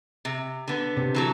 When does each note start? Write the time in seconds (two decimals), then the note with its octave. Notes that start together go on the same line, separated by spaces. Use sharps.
0.25 C3
0.68 D3 B3
0.97 C3
1.15 E3 F#3 A4